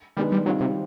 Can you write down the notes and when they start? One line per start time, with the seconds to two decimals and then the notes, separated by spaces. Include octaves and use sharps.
0.17 D#3 G3 G#3 B3 D4
0.32 G3
0.46 D#3 F#3 G3 C4 F4
0.60 C3